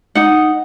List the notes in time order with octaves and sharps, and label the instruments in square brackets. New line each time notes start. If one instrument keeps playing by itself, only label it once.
[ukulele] D#4 F#5